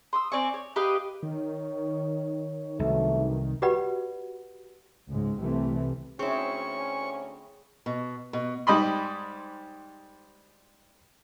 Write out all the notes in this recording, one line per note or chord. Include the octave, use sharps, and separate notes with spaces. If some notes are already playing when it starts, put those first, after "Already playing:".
C6 D#6 E6
C4 D5 G#5 C#6
C#5
G4 B4 D#5 F5
D#3 C#5
C2 C#3 E3 F#3 A3
F#4 G4 B4 D5 F#5 B5
C#2 G#2 G#3
C2 C3 E3 G3 A3
D2 C4 C#4 E4 G#4 C#5 C#6
B2
B2
G#2 G3 D#5 B5 C6